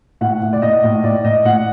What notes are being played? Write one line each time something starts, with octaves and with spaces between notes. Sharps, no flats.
A2 F#5
A2
D5
A2 D#5
A2
A2 D5
A2 D#5
A2 F#5